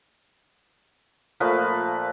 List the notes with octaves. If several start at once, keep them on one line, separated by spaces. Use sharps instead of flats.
A#2 F3 A3 B4